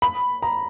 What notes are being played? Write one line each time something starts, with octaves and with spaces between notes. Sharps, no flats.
B5
A#5